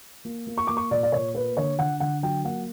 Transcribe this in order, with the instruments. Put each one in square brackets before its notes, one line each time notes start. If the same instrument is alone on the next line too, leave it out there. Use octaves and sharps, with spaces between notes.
[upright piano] A#3
A#3
C#6
A#3 D6
C#6
A#2 D5
D5
A#2 C#5
A#3 B4
D3 C#5
D3 F#5
D3 F#5
F#3 G5
A#3 F#5